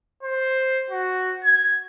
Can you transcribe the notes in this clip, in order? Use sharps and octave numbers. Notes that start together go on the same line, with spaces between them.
C5
F#4
G#6